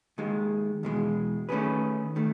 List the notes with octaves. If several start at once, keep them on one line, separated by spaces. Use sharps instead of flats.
D#2 D#3 G#3
E2 B2 G#3
D#3 A3 C#4 G#4 B4
D#3 A3